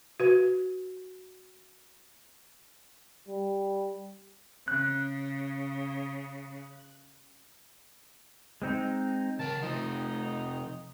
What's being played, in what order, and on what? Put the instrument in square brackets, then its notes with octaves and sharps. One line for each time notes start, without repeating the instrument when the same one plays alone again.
[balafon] F#4 B4
[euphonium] G3
[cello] C#3 [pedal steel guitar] F#6
[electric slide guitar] G#3 C4 D#4
[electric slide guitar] C#3 A#4 [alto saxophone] A5
[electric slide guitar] C3 F3 [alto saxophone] D#4